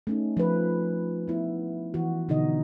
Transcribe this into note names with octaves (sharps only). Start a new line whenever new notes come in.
A3 C#4 D#4
F3 B4
B3 E4
E3 F#4
B2 D3 D#4 F#4 D#5